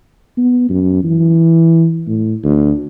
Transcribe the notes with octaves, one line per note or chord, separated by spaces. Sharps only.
B3
F#2
E3
A2
D2